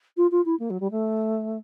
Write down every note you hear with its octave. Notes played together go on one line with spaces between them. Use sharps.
F4
F4
E4
A#3
F#3
G3
A3